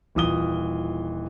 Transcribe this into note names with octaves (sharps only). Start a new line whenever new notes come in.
D#1 E3 F4 D#6 G7